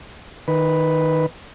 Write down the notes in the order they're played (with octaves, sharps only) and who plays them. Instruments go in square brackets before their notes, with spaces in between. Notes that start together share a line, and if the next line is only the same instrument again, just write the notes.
[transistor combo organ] D#3 B4